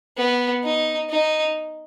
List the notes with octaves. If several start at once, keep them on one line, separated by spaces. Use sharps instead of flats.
B3
D#4
D#4